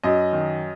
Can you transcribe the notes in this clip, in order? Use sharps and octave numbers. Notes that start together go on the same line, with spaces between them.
F#2 D#5
D#3